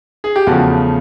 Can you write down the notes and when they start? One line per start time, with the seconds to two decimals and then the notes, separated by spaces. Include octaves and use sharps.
0.24 G#4
0.36 G4
0.47 E2 C#3 F3 A3 F#4